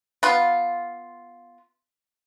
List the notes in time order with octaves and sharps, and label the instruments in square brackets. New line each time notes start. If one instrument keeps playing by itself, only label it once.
[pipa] B3 F4